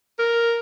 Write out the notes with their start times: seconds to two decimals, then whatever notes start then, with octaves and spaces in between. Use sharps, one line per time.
0.19 A#4